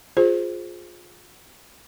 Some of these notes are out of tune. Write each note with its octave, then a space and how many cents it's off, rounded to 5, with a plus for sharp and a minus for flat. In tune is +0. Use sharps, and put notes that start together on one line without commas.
F4 +15 G#4 +0 C5 +0